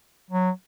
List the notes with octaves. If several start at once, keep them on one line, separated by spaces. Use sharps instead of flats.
F#3